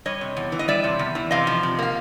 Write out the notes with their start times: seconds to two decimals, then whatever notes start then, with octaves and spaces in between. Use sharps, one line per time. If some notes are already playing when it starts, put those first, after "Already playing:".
0.06 G3 C#5 D#5
0.21 C3
0.37 E2
0.52 E3
0.59 D#5
0.68 G3 D5 E5
0.84 C3
0.99 E2
1.15 E3
1.31 C3 D#5 F5
1.47 F3
1.63 C3
1.79 A#3 F5